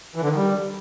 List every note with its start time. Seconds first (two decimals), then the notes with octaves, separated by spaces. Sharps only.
0.16 E3
0.22 D3
0.29 D#3
0.36 G3